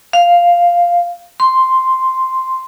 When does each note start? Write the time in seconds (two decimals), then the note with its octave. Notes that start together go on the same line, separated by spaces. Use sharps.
0.13 F5
1.40 C6